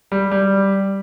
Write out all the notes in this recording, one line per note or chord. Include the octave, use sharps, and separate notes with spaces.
G3
G3